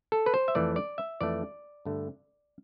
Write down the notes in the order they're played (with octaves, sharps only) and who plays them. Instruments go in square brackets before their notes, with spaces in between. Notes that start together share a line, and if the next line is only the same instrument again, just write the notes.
[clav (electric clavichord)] A4
B4
C5
E5
F2 E3 A3 D5
D5
E5
F2 E3 A3 D5
G2 D3 A3